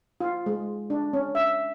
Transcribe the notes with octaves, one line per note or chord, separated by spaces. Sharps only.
F4
G#3
D4
C#4
E5